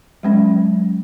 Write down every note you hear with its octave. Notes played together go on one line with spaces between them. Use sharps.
F#3 G#3 C#4